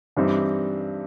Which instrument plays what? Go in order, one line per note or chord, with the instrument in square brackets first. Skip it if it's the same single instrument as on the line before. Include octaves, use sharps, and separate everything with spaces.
[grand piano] G2 E3 G3 C4 D#4